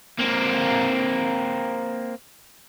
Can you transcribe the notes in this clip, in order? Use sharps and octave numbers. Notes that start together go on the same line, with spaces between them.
A#3 C4